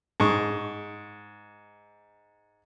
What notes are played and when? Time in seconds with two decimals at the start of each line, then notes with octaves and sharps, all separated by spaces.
0.20 G#2 C#6